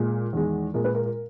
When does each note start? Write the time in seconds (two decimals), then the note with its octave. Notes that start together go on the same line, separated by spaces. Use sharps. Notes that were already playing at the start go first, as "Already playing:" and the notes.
Already playing: A#2 G#3
0.33 E2 D#3 G#3
0.74 A#2 G#3 A#4
0.84 B4
0.94 A#4
1.05 A#4